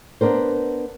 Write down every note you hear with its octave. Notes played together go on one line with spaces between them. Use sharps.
B3 D4 A#4 C5